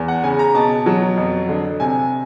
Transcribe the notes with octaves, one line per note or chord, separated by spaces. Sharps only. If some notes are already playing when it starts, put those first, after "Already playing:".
Already playing: E2
F#5
C#3 G#5
A#5
B2 A5
F#3
F2
D3
C3 G#5